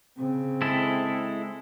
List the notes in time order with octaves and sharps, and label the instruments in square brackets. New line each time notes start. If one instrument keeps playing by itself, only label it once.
[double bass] C#3 [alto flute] C4
[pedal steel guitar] G#3 E4 A4